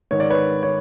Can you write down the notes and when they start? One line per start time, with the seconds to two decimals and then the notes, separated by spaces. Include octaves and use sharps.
0.11 G#2 D#3 C#5
0.20 D5
0.30 B4 C#5
0.63 C#5